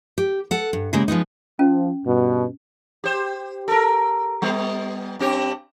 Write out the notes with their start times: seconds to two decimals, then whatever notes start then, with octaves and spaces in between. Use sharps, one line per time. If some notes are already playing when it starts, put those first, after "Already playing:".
0.18 G4
0.51 A4 F#5
0.73 G2
0.93 C#3 G3 G#3 A#3 E4
1.08 F3 G#3 B3 D#4
1.59 F3 C#4
2.06 G2 B2
3.04 G4 C5
3.68 A4 A#4
4.42 G3 B3
5.19 G2 C4 G4